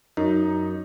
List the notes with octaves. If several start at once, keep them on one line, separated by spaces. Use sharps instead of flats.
F#2 D#4